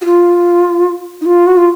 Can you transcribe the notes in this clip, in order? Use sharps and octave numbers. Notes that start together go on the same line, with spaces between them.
F#4
F4
D#4
F4
F#4
F4